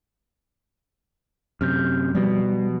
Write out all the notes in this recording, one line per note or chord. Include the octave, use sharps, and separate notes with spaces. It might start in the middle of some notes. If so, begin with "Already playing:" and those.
F#2 C3 F6 G6
B2 F3 G3